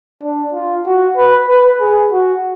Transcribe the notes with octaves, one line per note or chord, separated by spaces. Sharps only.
D4
F4
F#4
B4
B4
G#4
F#4